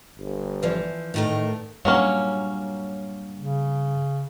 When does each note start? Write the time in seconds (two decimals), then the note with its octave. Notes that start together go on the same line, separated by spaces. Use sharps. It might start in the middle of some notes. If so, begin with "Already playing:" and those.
0.18 G1
0.63 E3 F3 B4 D5
1.14 A2 D#3 A3 A#4
1.85 G2 A#2 F#3 A#3 C#4
3.37 C#3